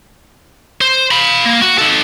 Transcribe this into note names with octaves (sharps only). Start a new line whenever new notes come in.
C5
F5 B5
A#3
F#4
D#4 A4